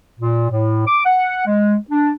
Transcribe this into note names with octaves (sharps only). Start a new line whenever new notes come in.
A#2
A2
D6
F#5
G#3
D4